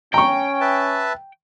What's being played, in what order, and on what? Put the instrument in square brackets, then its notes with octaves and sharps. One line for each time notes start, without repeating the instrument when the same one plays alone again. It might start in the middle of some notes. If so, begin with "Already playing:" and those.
[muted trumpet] C#4 [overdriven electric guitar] G5 [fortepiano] A#5 C#6
[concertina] B4 E5 A5